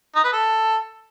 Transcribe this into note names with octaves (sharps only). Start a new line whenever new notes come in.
D#4
B4
A4